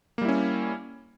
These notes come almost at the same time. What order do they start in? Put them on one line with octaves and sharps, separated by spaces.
A#3 G3 E4 C#4